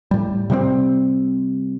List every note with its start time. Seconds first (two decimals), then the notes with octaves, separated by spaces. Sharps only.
0.11 A2 G3
0.50 C3 G3 B3 C4